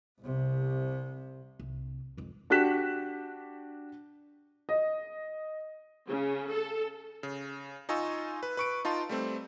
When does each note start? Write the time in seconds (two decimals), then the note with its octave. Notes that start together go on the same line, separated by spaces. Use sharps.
0.20 C2 C3
1.59 C2
2.17 F2 G#3
2.50 D4 F#4 G4 F#6 B6 E7
4.69 D#5
6.07 C#3
6.50 A4
7.23 C#3
7.89 D#4 F4 D#5 G#5 C#6 E6
8.43 B4
8.57 B4 C#6 D7
8.85 D#4 F4 A5 C6
9.09 G3 A3 C4